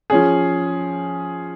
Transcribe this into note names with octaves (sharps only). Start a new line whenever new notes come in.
F3 C#4 G#4